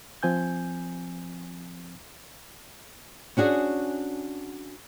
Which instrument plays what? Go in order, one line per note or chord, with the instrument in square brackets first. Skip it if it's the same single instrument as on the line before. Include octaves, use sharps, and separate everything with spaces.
[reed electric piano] F3 C4 G#5 G6
[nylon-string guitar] C#4 D4 F#4 G#4